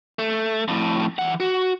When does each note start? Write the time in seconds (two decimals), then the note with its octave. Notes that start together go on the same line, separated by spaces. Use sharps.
0.19 A3
0.68 F2 A2
1.19 E3 F#5
1.40 F#4